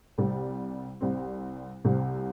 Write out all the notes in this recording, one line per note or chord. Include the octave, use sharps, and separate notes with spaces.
C2 C3 G3 C4
C2 C3 G3 C4
C2 C3 G3 C4